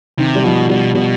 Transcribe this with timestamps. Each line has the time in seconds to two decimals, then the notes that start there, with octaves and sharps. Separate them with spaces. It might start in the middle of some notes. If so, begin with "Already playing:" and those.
0.19 C3 D#3
0.35 G3
0.44 B2 F3
0.69 B2 G3
0.95 B2 G3